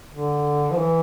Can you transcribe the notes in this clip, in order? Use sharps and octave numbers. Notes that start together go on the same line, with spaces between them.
D3
F3
E3